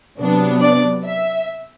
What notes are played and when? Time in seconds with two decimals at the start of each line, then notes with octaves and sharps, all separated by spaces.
0.18 C3 F#3 B3 D4
0.62 D5
1.04 E5